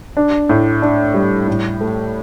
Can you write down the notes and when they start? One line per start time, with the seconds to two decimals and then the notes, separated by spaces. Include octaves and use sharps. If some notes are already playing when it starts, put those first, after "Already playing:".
0.17 D4
0.49 A2
0.82 D4
1.14 G3
1.48 A2
1.81 A3